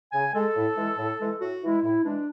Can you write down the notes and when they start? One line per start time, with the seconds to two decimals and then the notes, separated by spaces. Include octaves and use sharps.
0.13 C#3 G#5
0.34 G#3 A4
0.55 A2
0.77 E3 G#3
0.97 A2
1.19 E3 G#3
1.40 A2 F#4
1.62 E3 G#3 E4
1.83 A2 E4
2.04 E3 G#3 D4